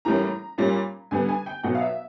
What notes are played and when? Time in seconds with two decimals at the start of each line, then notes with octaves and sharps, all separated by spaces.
0.05 A2 E3 G3 A#3 C#4 A#5
0.58 A#2 G3 A#3 C#4
1.11 D3 G3 B3 G#5
1.29 G#5
1.46 G5
1.63 B2 F#3 B3 F#5
1.75 F5
1.81 E5